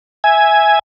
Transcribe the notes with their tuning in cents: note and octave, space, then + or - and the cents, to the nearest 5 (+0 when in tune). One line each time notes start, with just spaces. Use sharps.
E5 -5 G#5 +0